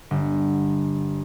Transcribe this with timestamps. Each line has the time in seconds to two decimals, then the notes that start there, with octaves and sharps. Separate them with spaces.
0.11 G1